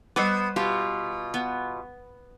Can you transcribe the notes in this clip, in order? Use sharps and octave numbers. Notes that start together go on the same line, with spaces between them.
G3 B3 B4 C5 D6
B2 F4 G4
B3